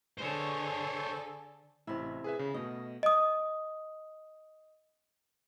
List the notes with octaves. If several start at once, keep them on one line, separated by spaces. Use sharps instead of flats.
D3 G#4 A4 C5 C#5
A1 C3 E4
G#4 B4 E5
C#3
B2 A3 D#5
D#5 D#6